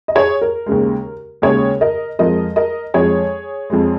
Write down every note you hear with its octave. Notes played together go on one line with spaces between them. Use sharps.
D#5
G#4 C#5
A#4
D#2 C#3 G#3
D#2 C#3 G#3 G#4 C#5
A#4 D#5
F2 F3 G#3 A#4 D#5
A#4 D#5
F2 F3 G#3 G#4 C#5
F2 F3 G#3